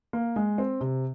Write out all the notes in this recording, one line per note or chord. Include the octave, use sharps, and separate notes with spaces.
A#3
G#3
C4
C3